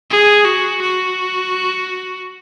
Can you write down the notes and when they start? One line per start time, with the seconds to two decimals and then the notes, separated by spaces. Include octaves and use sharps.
0.10 G#4
0.45 F#4
0.81 F#4